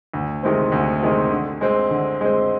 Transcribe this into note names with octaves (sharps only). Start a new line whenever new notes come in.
D2
C3 D#3 G#3 C4
D2
C3 D#3 G#3 C4
D3
G#3 C4
D3
G#3 C4